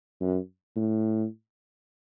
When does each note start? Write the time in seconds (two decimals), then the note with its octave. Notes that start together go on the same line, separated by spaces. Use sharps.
0.21 F#2
0.76 A2